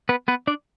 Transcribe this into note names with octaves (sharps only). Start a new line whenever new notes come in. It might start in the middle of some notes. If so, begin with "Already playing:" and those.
B3 B4
B3 B4
D4 D5